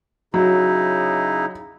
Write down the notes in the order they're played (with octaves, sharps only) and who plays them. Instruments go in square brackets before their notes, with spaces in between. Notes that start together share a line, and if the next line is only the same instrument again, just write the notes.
[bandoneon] C#3 D#4 E4 [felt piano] F#3